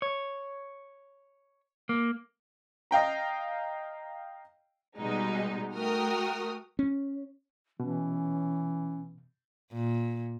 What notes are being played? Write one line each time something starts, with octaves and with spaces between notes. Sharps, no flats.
C#5
A#3
D#5 F5 G5 A#5
B2 G3 G#3 D#4
A3 F#4 A#4 G5 D#6 F6
C#4
B2 E3 C#4
A#2